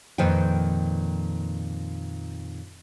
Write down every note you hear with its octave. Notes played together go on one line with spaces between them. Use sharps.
F2 A#2 D#3 B4 C5 G5